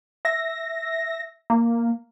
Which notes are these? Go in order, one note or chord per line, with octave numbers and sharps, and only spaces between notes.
E5 A#6
A#3